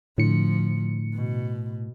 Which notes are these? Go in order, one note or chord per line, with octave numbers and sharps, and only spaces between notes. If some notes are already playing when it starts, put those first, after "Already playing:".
A2 D3 F3 C#7
B2